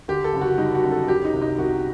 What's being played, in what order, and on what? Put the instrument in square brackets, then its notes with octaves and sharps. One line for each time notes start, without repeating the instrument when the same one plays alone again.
[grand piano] D3 G4
A4
F#1
F#4
G3 D#4
F#4
F#2
A4
F#3 G4
D#4
C2
D#4
C2 F#4